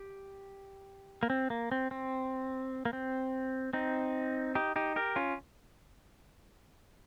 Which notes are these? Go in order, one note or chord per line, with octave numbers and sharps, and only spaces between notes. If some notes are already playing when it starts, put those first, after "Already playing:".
Already playing: G4
A#3
C4
A#3
C4
C4
A#3
C4
C4 D#4
D#4 G4
D#4 G4
G4 A#4
C#4 F4